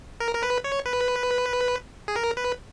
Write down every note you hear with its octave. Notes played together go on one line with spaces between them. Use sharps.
A#4
A#4
B4
C#5
B4
G#4
A#4
B4